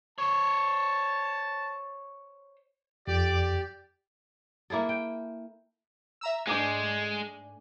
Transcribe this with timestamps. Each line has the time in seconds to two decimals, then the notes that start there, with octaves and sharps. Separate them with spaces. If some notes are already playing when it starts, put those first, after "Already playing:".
0.18 C5 C#5 A5
3.07 F2 G4 D5
4.70 A#3 E4 G#4 A4
4.89 G5
6.21 E5 A#5 E6
6.47 G#2 G#3 A3 D4 G#5 D6 G6